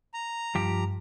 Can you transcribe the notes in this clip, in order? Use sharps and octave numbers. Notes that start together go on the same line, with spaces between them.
A#5
G2 F3 G4